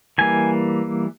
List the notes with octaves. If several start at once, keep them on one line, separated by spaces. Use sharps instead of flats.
E3 G3 A#3 G#5